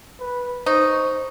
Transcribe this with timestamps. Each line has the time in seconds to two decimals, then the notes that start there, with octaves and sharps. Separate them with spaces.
0.20 B4
0.66 D#4 C5 C#6